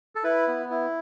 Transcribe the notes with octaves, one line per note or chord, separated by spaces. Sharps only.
A4
E4 B4
B3
E4